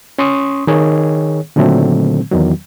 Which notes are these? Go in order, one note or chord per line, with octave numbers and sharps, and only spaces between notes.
C#4 C6 C#6 D#6
D#3 G#4 C#5
A#2 D3 D#3 F#3 A3 C4
E2 D#3 F#3